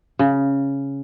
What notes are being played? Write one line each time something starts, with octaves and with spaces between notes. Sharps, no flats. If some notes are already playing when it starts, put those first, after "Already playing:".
C#3